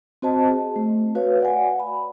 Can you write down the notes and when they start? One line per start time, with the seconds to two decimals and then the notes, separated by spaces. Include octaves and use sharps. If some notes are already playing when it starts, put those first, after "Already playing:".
0.22 C4 F#4 C5 D#5 A5
0.49 G#4
0.76 A3
1.15 F#4 B4 C#5 F5
1.40 D5 F#5 G#5
1.80 B5